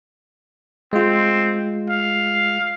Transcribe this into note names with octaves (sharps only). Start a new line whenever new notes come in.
G#3 C4 F4
F5